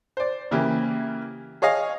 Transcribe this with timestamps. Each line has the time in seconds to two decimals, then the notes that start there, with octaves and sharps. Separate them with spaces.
0.17 C5 D5
0.51 C#3 E3 A#3 E4 G4
1.62 G#4 C#5 D#5 F5